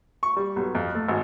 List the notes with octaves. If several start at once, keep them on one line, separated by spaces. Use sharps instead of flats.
C#6
G3
B1
F2
A3
G#1